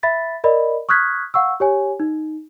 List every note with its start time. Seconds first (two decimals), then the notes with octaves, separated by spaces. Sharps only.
0.03 E5 B5 A6 B6
0.44 A#4 D5 D#5 B5
0.89 C#6 D#6 F6 F#6 G#6 B6
1.34 F5 F#5 C#6 E6
1.60 G4 C#5 G#5
2.00 D#4